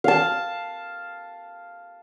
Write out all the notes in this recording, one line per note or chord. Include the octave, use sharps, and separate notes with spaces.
F5 A5